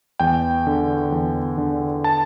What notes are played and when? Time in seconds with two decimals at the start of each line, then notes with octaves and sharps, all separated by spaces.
0.20 E2 G5
0.67 D3
1.12 E2
1.58 D3
2.04 A5